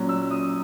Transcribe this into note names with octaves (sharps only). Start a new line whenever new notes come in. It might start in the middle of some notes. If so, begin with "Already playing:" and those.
Already playing: A#2 F#3 C#4
E6
D#6